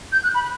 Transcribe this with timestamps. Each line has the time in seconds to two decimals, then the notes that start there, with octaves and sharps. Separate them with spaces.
0.12 G6
0.24 F#6
0.34 B5